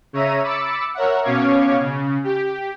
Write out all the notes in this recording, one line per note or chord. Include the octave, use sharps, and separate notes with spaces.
C#3 C#5 E5 A#5 D#7
B5 D6 E6 A6 C#7
A#4 C#5 E5 F#5
B2 C#4 C#5 F5 D6 G#6
C#3
G4